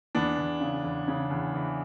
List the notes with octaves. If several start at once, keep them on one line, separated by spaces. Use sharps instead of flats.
E2 B3 D4
E2
C#3
E2
C#3
E2
E3